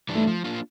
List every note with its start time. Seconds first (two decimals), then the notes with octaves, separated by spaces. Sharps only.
0.09 E3 G3 D4
0.15 A3
0.27 F3
0.44 A#3 D4 F4